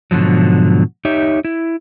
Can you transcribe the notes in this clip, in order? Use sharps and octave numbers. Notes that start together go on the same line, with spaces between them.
G#2 B2 D3 F3 F#3
D#4 G4 C#5 E5
E4